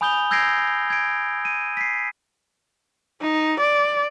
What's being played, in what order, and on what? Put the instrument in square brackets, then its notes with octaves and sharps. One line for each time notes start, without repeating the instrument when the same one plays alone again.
[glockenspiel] G#5 B5 D#6 G6 F7 G7
E6 G6 G#6 A#6 C7 D7
G#6 D7
D#7
B6 C7
[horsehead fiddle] D#4
D5